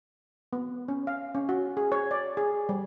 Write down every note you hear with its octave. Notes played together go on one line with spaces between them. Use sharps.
B3
C#4
F5
C#4
F#4
G#4
C#5
D5
G#4
G3